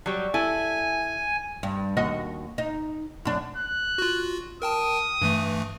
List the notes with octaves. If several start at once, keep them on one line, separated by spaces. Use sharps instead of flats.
F#3 G3
E4 A4 G#5
G2
D#2 F#4 D#5
D#4
F#2 D4
F#6
F4 F#4
A#4 G5 A5 D#6
G2 E3 A3